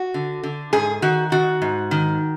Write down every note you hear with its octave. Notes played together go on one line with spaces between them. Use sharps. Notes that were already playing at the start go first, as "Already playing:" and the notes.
Already playing: F#4
D3
D3
G#2 G#4
D#3 F#4
D#3 F#4
G#2
D#3